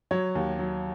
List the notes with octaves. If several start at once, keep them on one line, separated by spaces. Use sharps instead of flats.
F#3 C#5
D#2
F#3